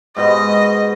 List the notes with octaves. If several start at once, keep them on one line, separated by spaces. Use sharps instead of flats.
G#2 B2 B3 D#5